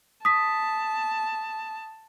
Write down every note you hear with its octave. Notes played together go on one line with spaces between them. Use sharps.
A5 D#6 B6